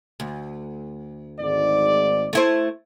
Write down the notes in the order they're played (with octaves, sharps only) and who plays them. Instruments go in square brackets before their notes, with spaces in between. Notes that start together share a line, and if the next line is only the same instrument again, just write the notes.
[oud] D2
[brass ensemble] G#1 G#2 D5
[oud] A3 E4 C5